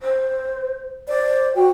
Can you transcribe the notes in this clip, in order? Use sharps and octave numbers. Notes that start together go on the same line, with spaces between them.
C5
C5 D5
F#4 G5